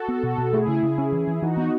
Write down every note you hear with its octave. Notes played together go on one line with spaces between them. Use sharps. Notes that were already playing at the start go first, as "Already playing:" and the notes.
Already playing: F#4 A4
B3
B2
B2
A3 E4 G#4
C#3
C#3
C#4
E3
E3
E3 D#4 F#4
B3